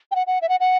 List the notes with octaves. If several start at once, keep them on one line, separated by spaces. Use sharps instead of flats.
G5
F#5
F#5
E5
F#5
F#5